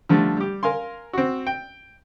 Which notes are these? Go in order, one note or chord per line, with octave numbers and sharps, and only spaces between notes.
D3 F3 G3 A3
G3 G4
A#4 F5 G#5 C6
C4 F#4
G5